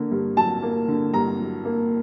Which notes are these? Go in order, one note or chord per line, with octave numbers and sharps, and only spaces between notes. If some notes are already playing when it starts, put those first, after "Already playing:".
Already playing: D3 A#3
G2
F#3 A5
A#3
D3
G2 A#5
F#3
A#3